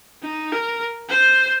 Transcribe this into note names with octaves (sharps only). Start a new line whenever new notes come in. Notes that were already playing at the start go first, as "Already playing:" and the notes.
D#4
A#4
C5